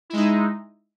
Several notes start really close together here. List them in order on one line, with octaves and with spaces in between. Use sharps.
E4 G#3 D#4